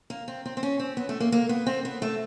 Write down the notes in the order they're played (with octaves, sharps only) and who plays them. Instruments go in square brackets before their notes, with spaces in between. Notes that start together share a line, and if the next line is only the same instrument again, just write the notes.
[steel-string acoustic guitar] A#3
C4
C4
C4
C#4
C4
B3
A3
A#3
A#3
B3
C4
B3
A3